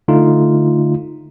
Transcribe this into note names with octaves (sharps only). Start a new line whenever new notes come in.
D3 A3 D#4 F4